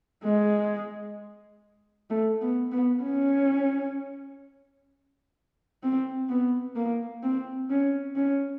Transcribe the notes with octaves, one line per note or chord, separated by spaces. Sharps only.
G#3
A3
B3
B3
C#4
C4
B3
A#3
C4
C#4
C#4